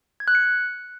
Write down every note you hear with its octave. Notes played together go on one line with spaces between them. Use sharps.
G#6
F#6
C#7